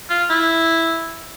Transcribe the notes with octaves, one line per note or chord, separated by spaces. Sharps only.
F4
E4